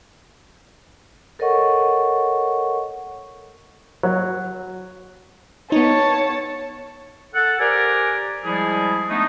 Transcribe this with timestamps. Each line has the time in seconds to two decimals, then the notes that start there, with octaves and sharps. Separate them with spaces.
1.39 A4 A#4 C#5 D#5 F#5 C#6
4.03 F#3
5.72 B3 D#4 C#5 A5
7.34 A4 F#5
7.59 G4 A#4 C5 D5 G#5
8.44 F3 G3 G#3 E4 G#4
9.08 G#3 A3 B3 D4 D#4